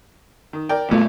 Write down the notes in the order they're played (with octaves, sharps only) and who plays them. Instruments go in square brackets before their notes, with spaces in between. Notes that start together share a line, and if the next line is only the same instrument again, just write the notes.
[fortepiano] D#3
A#4 D5 G5
[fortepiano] A#2 [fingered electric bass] A3 B3